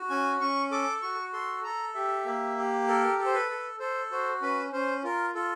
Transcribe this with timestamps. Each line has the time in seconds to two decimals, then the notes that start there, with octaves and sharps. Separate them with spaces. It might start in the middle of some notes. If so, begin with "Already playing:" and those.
Already playing: F#4
0.10 C#4 G#5
0.40 C#4 C#6
0.71 A4 D6
1.02 F#4 C#6
1.33 A4 C6
1.64 A4 A#5
1.95 G4 E5
2.25 A#3
2.57 G4
2.87 A4 A#4
3.19 A4
3.25 C5
3.34 B4
3.50 A4
3.80 A4 C5
4.11 F#4 C5
4.42 C#4 B4
4.72 C#4 C5
5.03 F4 A#4
5.35 F4 A4